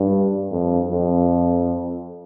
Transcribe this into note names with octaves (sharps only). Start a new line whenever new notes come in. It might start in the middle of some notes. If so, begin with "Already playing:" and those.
Already playing: G2
F2
F2